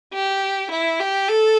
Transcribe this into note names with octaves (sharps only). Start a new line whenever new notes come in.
G4
E4
G4
A4